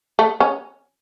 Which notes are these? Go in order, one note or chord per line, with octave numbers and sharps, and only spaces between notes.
A3
C#4